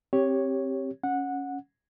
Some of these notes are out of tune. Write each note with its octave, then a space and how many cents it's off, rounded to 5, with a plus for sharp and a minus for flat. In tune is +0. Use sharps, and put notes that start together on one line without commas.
C4 +20 G4 +0 C#5 +0
C#4 +0 F#5 -15